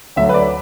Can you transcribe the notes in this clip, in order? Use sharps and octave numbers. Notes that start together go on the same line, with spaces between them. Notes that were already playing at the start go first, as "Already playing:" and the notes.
D2 D3 F#3 E5
B4
D5